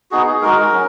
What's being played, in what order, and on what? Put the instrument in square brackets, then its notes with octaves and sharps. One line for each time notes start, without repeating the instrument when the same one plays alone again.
[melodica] B3 D#4 F#4 G#4
G#4
G#3 D#4 F#4 A#4
F#3 C#4